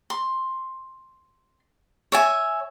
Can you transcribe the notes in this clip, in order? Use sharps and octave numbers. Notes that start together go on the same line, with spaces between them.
C6
C#5 E5 G#5